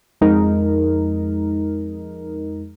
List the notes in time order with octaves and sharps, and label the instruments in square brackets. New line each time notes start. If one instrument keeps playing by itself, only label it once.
[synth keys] F2 G#3 D#4 A#4